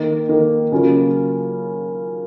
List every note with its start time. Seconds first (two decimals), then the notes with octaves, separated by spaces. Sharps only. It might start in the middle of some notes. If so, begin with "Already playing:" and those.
Already playing: D#3 A#3 D#4
0.29 D#3 A#3 D#4
0.72 C#3 F#3 A#3 C#4 F4